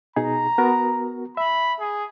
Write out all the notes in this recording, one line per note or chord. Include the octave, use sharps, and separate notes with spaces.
B2 D#4 G#4 A#5
B3 F#4 A#4
E5 B5
G#4